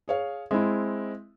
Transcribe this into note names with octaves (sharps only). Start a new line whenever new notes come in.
G#4 C#5 F5
G#3 C4 E4 E5